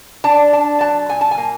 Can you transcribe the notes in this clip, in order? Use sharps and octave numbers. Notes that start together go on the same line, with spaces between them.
D4 A5
D4 A5
F#3 A5
A#2 G#5
A5
G#5
A#3